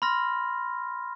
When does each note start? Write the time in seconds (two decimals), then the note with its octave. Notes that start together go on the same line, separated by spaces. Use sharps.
0.02 B5 C6 F6 A#6